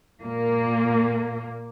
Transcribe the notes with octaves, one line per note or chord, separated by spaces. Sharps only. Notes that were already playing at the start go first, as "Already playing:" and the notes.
A#2 A#3